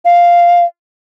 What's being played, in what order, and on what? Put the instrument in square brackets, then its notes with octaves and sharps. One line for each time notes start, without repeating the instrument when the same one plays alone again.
[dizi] F5